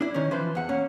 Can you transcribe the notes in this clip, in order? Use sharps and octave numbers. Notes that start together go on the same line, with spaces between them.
D4 E4
D#3 C#4
E3 F3 B4 C5
E2 F#5
A#3 C#4